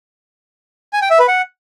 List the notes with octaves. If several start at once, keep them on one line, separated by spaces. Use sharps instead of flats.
G#5
G5
E5
B4
F#5